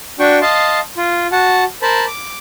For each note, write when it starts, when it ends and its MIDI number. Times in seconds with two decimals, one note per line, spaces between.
0.20 0.39 62
0.20 0.39 66
0.20 0.39 79
0.20 0.39 85
0.42 0.80 75
0.42 0.80 77
0.42 0.80 81
0.42 0.80 84
0.97 1.27 65
1.32 1.64 66
1.32 1.64 78
1.32 1.64 81
1.82 2.05 70
1.82 2.05 72
1.82 2.05 81
1.82 2.05 83
2.07 2.38 86